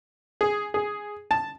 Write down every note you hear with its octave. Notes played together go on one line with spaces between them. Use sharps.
G#4
G#4
A5